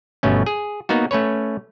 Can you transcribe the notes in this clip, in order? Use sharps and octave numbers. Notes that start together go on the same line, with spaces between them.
G1 B2 A3 C#4
G#4
A#3 B3 D#4 F#4
A3 C#4 B4 C#5